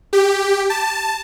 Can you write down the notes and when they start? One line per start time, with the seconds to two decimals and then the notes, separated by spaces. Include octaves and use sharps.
0.13 G4
0.70 A5